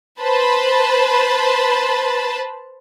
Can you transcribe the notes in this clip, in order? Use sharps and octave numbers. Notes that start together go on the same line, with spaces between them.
B4 C5 A5 B5